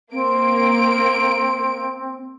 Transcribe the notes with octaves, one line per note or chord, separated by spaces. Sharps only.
A#3 C4 D7